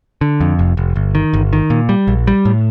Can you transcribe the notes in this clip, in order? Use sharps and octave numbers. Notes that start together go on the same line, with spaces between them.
D3
F2
F1
F1
G1
D#3
G1
D#3
A#2
G3
A#1
G3
A2